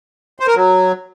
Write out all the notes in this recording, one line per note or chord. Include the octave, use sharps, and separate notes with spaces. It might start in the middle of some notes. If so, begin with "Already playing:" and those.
C5
A#4
F#3